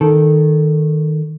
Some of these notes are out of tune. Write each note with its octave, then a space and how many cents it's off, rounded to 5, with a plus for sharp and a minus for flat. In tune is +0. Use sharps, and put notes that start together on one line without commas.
D#3 +0 A4 +0